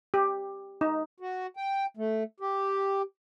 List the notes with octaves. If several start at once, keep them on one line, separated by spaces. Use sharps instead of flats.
G4
D#4
F#4
G5
A3
G4